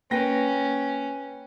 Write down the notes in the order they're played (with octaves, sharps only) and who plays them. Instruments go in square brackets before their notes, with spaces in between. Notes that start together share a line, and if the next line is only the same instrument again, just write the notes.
[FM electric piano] A#3 [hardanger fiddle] C#4 [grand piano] B4 G5 A#6